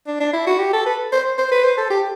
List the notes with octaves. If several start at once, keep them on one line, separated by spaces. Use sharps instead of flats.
D4
D4
E4
F#4
G4
A4
B4
C5
C5
B4
C5
A4
G4